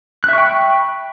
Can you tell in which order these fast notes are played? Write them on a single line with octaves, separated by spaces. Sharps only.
F#6 E5 C#6 G5 B5